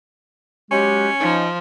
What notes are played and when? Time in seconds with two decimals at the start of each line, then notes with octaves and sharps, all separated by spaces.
0.71 F#3 G#3 C#4 G4
1.20 F3 D#4